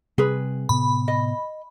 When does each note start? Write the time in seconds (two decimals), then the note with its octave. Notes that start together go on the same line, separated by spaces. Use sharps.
0.18 C3 G3 C4 G#4 B4
0.69 A2 C3 B3 B5
1.08 D#5